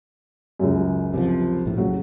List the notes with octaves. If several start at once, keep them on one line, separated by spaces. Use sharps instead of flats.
C#2 F#2
C3 D#3 F3
A#1 A2
C#3 F#3